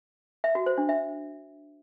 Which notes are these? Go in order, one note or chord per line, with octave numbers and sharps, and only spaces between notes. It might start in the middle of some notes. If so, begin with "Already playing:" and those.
E5
F#4
C5
D4
E5